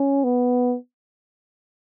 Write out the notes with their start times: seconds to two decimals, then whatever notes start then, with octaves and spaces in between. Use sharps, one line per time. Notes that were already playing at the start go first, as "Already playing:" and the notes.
Already playing: C#4
0.24 B3